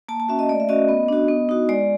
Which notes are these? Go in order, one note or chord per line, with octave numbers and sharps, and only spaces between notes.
A#3 A5
A5
C#4 F#4 E5
D#5
A3 D5
E5
C#4 F#4 D#5
B3
D4 F#4
B3
D#4 F#4
G#3 D5